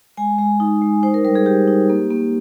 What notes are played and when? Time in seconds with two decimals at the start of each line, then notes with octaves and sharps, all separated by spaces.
0.17 G#3 G#5
0.38 G#3
0.60 D#4
0.82 G#3
1.03 D#4 C5
1.14 A#4
1.25 G3 A#4
1.35 G#4
1.46 G3 G4
1.68 D#4
1.90 A#3
2.10 A#3